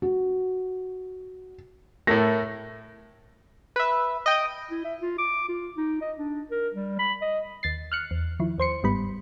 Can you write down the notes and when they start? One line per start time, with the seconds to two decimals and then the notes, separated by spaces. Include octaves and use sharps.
0.02 F#4
2.07 A2 A3 A#4 A#6
3.76 B4 E5
4.26 D#5 G5
4.71 E4
4.84 E5
5.00 F4
5.19 D6
5.49 F4
5.77 D#4
6.02 D#5
6.18 D4
6.51 A#4
6.74 G3
6.99 B5
7.22 D#5
7.63 D#2 A6 C7
7.92 F6 F#6 C#7
8.11 E2
8.40 D#3 F3 E4
8.58 D#2 C5 C6 C#7
8.83 G1 G#2 G3 B3 B5